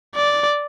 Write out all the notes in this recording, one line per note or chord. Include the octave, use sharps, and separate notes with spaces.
D5